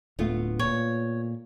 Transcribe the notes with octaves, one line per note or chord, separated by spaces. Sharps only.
D1 A3 B3 F4
A#2 C#5